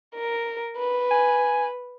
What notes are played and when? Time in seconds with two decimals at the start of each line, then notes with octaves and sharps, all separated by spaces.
0.15 A#4
0.77 B4
1.11 G#5